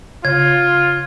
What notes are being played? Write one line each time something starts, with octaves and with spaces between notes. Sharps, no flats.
C#3 F4 G#6